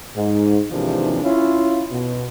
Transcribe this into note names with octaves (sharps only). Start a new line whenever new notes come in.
G#2
G#1 D#2 C3 E3 F3 D4
C#4 E4 F4
B2